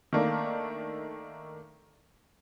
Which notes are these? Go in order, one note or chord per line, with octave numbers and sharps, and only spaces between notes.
D#3 A3 A#3 D4